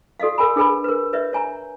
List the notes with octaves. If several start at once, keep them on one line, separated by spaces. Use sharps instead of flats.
F#4 A4 D5 D#5 F5
A4 A#4 G5 G#5 B5
D4 G#4 B4 G#5 B5
A#4 B4
B4 C#5 D#5 E5
C#5 G#5 A#5